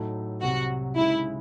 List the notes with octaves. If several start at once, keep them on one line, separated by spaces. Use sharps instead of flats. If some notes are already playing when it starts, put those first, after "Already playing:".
Already playing: A2 F#3 A3 D#4 A4
C2 C3 F#3 F#4
C#3 G#3 D#4 E4